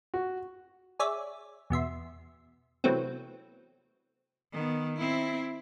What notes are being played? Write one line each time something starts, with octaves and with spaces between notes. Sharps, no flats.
F#4
G#4 C#5 D5 E5
E2 B2 E5 C6
C3 E3 F#3 A3 B3 C4
D#3 B3
C4 E4